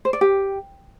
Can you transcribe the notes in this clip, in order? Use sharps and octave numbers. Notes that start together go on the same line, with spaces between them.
C5
D5
G4